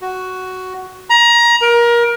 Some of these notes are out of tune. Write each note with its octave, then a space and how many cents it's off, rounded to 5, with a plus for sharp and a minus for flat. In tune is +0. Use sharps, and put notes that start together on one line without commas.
F#4 +5
A#5 +25
A#4 +25